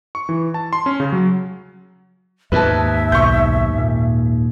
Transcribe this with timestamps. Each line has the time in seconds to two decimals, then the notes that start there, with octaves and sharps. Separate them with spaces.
0.15 C#6
0.29 E3
0.54 A5
0.73 C6
0.86 C#4
1.00 C#3
1.12 F#3
2.52 D#2 G#2 B4 E5 A5
3.12 B1 C#6 G6
3.78 A#2